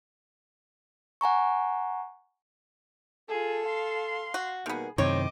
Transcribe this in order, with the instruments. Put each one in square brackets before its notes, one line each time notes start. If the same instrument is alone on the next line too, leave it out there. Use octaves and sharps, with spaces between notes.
[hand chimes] F#5 G#5 A#5 C#6
[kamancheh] F4 G#4 [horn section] A4
[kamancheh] F5 C6
[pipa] F#4
[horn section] B2 G3 A#3 [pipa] D#3 B3 [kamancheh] G#4
[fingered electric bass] F#2 C3 D#3 [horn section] A2 C4 [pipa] C#5 [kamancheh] D#5 D6